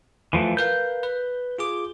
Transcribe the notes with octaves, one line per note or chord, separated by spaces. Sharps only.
E3 F3 A3
A#4 B4 F5 G6
B4
F4 G#4 D6